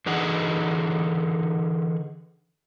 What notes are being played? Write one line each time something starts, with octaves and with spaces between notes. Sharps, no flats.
D3 E3 D#4 G#4 F#5